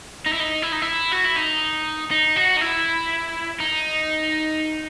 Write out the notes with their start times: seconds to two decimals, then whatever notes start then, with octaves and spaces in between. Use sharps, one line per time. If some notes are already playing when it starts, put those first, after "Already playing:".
0.26 D#4
0.33 E4
0.40 D#4
0.62 E4
0.72 D#4
0.82 E4
1.12 F#4
1.25 E4
1.37 D#4
2.11 D#4
2.36 F#4
2.57 D#4
2.61 E4
3.60 D#4